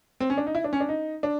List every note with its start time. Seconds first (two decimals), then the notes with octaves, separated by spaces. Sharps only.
0.20 C4
0.30 C#4
0.38 D4
0.47 D#4
0.55 E4
0.64 D4
0.73 C#4
0.80 D4
0.89 D#4
1.23 D4